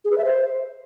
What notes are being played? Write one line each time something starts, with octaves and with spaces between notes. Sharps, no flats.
G#4
B4
E5
C5